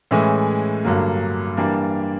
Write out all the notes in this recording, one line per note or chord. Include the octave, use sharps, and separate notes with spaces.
A2 E3 G#3 C#4
G2 D3 F#3 A#3
E3 G3 A#3 D4